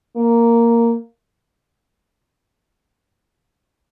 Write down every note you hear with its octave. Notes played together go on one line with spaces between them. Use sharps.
A#3